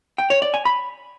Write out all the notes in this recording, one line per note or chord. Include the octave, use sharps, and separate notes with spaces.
G5
C#5
D5
G#5
B5